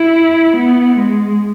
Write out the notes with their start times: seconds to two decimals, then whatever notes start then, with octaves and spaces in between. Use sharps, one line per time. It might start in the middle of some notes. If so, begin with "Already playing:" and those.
Already playing: E4
0.56 B3
0.97 G#3